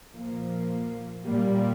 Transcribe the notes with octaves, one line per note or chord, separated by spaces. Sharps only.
A#2 F3 A#3
A#2 G3 A#3